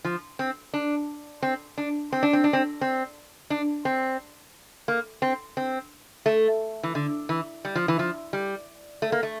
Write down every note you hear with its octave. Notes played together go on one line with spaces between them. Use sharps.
F3
C4
D4
C4
D4
C4
D4
C4
D4
C4
C4
D4
C4
A#3
C4
C4
A3
E3
D3
E3
G3
F3
E3
F3
G3
A3
A#3
A3